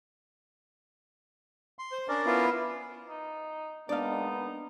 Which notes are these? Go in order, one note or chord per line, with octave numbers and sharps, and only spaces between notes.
C6
C5
C#4 D4 A#4 D5
B3 E4 F4
D#4
G#3 A#3 B3 D4 D#4 D5 F5